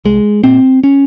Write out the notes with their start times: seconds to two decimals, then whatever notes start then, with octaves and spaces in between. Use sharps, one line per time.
0.05 C2 G#3
0.44 A#2 C4
0.84 C#4